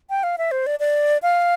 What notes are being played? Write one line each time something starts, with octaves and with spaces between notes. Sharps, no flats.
G5
F5
E5
C5
D5
D5
F5